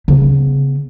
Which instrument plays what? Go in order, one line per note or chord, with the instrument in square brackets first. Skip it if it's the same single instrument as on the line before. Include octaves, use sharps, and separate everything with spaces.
[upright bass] C#3 B3